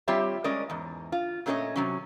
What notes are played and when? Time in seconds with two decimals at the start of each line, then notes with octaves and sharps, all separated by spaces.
0.08 G3 C4 F4 G4 C#5 E5
0.44 G#3 C#4 A#4 D5 D#5
0.70 E2 G#2
1.12 F4
1.46 A#2 A3 C#4 G4 C#5 D#5
1.76 C3 F#3 C#4